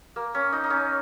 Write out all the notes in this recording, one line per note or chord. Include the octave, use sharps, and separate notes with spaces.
A#3
C#4
D#4
D#4
C#4